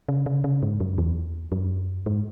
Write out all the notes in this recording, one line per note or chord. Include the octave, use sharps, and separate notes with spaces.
C#3
C#3
C#3
G#2
F#2
E2
F#2
G#2